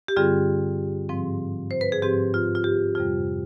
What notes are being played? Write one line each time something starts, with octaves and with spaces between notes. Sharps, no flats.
G4
G2 D3 G3 C4 F4 G#4
G#2 F3 C4
C5
B4
G#4
G#2 F3 C4 G4
F4
F4
G4
F2 C3 G3 F4